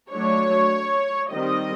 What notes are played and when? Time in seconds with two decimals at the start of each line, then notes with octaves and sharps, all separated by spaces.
0.12 F#3 A3 D4 C#5
1.33 D#3 G3 C4 D#5